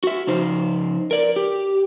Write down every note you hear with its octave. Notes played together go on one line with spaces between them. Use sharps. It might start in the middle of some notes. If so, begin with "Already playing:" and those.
F#4 E5
C#3 F3 D#4 C5
A#4 D5
G4